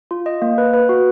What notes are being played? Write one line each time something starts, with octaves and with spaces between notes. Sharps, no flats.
F4
D#5
A#3
B4
B4
F#4